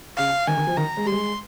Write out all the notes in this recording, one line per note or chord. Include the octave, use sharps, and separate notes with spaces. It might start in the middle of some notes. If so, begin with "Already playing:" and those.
C#3 F5
D#3 G#5
D#3
F3
D#3 A#5
G#3
G3 C6
G#3